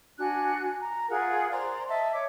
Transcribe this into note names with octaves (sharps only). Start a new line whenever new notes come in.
D4 F#4 G#5 F#6
A#5
F4 G#4 A#4 F#5
C5 D5 A#5 C6
D#5 E5 A5
C#5 D6